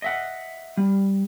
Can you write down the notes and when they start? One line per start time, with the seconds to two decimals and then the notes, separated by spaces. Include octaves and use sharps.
0.02 D#5 E5 F#5
0.77 G3